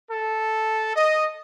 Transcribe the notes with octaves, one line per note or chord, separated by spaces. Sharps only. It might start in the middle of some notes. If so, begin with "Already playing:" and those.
A4
D#5